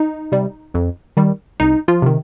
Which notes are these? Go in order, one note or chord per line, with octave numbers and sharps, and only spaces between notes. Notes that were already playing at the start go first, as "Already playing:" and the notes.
Already playing: D#4
C3 G3
F2
D#3 G3
C2 D#4
F3 F4
C3 D#3